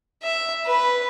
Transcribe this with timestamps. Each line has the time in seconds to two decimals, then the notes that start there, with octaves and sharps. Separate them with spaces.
0.23 E5
0.66 B4